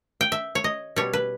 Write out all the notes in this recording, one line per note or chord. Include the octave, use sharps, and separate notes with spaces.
G5
E5
C#5
D#5
B2 G3 C#5
B4